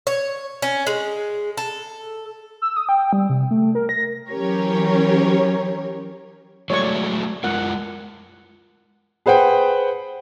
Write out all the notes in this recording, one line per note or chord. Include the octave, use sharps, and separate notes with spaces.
C#5
C#4
G#3
A4
E6
D#6
G5
G3
C3
A3
A#4
A#6
E3 F#3 C#4 G4 A#4 C#5
F#3 G#3 A3 C#5 D5 C#6
G#3 F4 A#4 F#5
G#4 B4 C5 F#5 G5